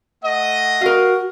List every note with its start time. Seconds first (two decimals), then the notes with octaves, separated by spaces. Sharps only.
0.24 A3 D#5 F#5
0.81 F#4 A#4 F5